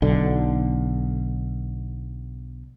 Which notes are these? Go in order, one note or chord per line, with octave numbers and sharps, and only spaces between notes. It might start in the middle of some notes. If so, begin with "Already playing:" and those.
B1 D3